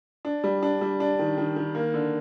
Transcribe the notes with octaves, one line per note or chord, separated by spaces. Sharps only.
D4
G3
D4
G3
D4
D#3
D#3
D#3
A#3
D3